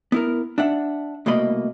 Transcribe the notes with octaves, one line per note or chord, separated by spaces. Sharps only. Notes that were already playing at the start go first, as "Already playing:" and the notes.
B3 E4 A#4
D4 E5 F#5
C2 B2 A3 A#3 D#5 B5